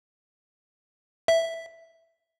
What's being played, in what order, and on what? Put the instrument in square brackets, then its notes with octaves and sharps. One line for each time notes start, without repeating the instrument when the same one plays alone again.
[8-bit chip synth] E5